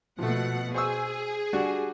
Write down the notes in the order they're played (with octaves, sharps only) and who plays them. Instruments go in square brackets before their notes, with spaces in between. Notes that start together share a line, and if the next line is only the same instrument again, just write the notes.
[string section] B2 F#5 [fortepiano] F3 A3
[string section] G#4 [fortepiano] C5 C#6 E6
[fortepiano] G3 D4 F#4